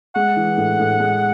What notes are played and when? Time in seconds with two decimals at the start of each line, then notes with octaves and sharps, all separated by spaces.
0.16 G#3 F#5
0.36 E3
0.57 A2
0.79 A2
1.00 G#3